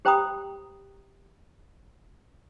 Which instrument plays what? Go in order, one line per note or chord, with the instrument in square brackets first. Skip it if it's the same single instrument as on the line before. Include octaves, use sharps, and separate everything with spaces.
[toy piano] G4 C5 G5 A#5 B5 D#6